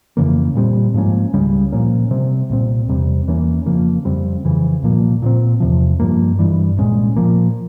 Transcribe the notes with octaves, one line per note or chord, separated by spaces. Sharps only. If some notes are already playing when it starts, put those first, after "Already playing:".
F2 C#3 E3 A#3
A#2 G3 C4
G#2 F3 A#3 C#4
C#2 C#3 G3 C#4
A#2 F3 A#3 C#4
C3 G3 C4
C2 A#2 G3 C4
E2 C3 G3 C4
E2 E3 A#3 C#4
F2 C#3 F3 A#3
F2 C#3 G3 C4
F2 C#3 E3
C2 A#2 F3 A#3
A#2 F3 C4
E2 C3 F3
G2 F3 A#3
G2 E3 G3
C2 A#2 G#3 C#4
A#2 F3 A#3